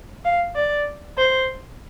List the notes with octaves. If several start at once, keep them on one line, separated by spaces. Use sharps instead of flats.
F5
D5
C5